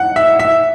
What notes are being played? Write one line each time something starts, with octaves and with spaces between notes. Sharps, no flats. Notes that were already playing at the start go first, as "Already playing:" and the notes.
Already playing: F#5
E5
E5